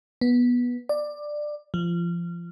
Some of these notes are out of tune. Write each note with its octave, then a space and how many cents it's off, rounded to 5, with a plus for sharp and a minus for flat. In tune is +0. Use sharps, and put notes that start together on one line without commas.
B3 -15
D5 +15
F3 -25